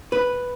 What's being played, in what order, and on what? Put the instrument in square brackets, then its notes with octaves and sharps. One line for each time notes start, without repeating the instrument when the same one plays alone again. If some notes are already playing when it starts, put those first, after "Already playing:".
[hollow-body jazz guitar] B4